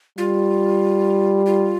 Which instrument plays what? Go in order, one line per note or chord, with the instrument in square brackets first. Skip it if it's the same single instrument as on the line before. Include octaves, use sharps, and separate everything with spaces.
[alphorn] G3 [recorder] F4
[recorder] F4